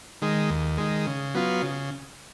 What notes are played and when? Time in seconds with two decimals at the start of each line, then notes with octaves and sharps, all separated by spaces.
0.22 D#3 G#3
0.50 D#2
0.78 D#3 G#3
1.07 C#3
1.34 F#3 B3 F4
1.62 C#3